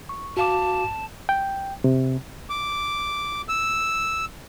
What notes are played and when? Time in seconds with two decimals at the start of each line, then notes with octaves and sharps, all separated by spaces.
0.09 C#6
0.37 F#4 F5 A5 D6
1.29 G5
1.84 C3
2.50 D6
3.49 E6